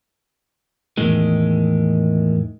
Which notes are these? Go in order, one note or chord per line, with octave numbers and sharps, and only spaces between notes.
E2 A2 D#3 G#3